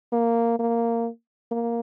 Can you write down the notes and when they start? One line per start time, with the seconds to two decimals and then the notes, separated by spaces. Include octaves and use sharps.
0.12 A#3
0.59 A#3
1.52 A#3